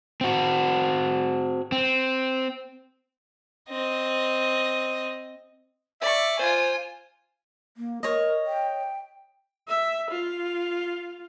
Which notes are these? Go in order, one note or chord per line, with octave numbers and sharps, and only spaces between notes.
C4 F#4
C4
C4 D#5
D5 E5 C#6
F4 C5 G#5
A#3
A#4 C#5 D#5
G5
E5
F4